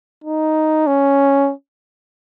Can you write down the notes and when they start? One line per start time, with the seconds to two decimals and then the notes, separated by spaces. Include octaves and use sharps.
0.24 D#4
0.87 C#4